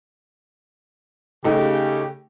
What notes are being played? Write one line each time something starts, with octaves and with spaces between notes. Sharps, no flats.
C#3 A3 D#4 G4